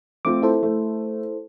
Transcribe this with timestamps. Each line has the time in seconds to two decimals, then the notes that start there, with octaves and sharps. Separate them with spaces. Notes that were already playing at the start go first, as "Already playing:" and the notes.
0.25 A3 C4 F4 D6
0.42 E4 A4 C5
0.63 A3